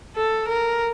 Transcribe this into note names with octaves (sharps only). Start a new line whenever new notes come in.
A4
A#4